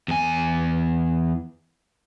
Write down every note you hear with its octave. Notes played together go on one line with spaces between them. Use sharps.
E2 G#5